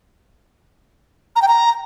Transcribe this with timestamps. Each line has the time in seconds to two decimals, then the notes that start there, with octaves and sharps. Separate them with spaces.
1.36 A#5
1.42 G5
1.48 A#5